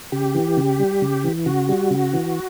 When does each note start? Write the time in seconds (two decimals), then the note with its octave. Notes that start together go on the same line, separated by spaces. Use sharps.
0.12 C#3 G4
0.34 E3
0.57 C#3
0.80 G3
1.02 C#3
1.24 E3
1.46 C#3 F#4
1.69 G3
1.91 C#3
2.13 E3